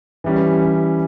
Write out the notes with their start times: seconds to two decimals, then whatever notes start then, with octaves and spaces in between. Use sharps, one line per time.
0.24 E3 G3 C#4